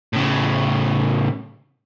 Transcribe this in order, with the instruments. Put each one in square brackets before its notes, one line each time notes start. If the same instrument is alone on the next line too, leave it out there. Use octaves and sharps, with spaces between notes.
[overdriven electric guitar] A2 C#3